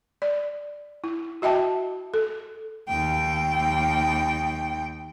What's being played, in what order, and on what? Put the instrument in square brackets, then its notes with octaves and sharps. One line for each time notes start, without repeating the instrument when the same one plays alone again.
[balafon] D5
E4
F#4 D#5 E5 G5 A5
A4
[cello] D#2 G5